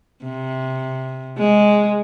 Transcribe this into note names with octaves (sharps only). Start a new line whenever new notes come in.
C3
G#3